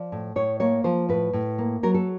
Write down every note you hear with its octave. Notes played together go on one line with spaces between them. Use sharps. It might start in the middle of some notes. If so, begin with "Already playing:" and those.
Already playing: F3 D5
A2
A2 C#5
A#3 C#5
F3 C5
A2 B4
A2
A#3
F#3 A#4
A4